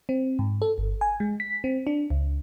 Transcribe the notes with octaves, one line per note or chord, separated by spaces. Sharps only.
C4
G#2
A4
G1
G#5
G#3
B6
C4
D4
C#2